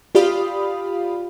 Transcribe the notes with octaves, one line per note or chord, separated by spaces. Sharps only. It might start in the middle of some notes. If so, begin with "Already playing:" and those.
F4 G4 D5 F5 B5 D#6